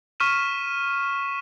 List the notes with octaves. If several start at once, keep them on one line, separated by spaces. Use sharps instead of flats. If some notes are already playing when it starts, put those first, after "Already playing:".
C#6 F6 B6 D#7 E7